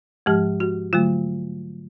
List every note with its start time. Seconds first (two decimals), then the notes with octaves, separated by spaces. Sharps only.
0.26 G#2 F3 G#3 G4
0.60 F#4
0.93 D3 F#3 A3 F4